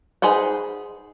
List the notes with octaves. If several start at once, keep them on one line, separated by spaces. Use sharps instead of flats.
D#4 G#4 B4 C5 F#5